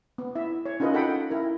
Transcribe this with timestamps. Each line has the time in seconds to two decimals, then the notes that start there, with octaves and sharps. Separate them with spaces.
0.18 B3
0.36 E4 E5
0.66 C#5
0.80 C#4 D#4 F4 A#4 B4 D#5
0.94 A4 F#5 G5 B5
1.31 E4 A#4